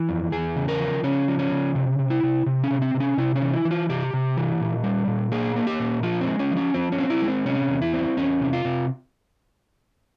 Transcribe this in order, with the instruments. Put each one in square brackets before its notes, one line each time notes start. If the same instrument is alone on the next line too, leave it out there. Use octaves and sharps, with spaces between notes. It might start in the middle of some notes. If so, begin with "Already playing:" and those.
Already playing: [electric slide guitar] E3
F2
E2 G#4
C#3
A#4
F3
C#3 C#4
F3
C#4
C#3
C3
C3
E4
C3
C3
C#4
C3
C4
C3
C#4
C3 E4
C#4
E3
E4
E3
F4
C3 G4
C3
E3
A#2
G3
A#2
A#3 G#4
A#3
G4
A#2
F3 F4
C4
G#3
C#4
F3
C#4
F3 C4
C#4
C4
E4
G#3
C4
C3 C#4
E2
E4
C4
E2 C#4
C3
F4
C3